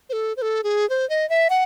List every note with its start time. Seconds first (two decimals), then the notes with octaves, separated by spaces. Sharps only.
0.09 C5
0.13 A4
0.37 C5
0.42 A4
0.64 G#4
0.90 C5
1.10 D#5
1.29 E5
1.50 F#5